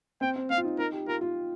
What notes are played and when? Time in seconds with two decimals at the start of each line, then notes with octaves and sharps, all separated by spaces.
0.21 C4 G5
0.36 C4
0.50 C4 F5
0.57 F4
0.64 D#4
0.79 D#4 A#4
0.92 G4
1.07 F4 A#4
1.21 F4